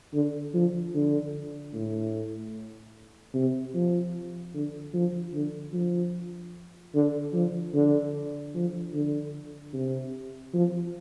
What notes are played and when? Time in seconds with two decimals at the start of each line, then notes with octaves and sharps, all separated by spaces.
0.14 D3
0.54 F3
0.95 D3
1.74 A2
3.34 C3
3.75 F3
4.54 D3
4.94 F3
5.34 D3
5.74 F3
6.95 D3
7.34 F3
7.74 D3
8.55 F3
8.94 D3
9.73 C3
10.54 F3